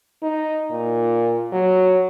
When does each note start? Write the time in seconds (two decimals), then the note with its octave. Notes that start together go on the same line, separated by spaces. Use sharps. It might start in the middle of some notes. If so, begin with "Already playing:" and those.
0.22 D#4
0.70 A#2
1.53 F#3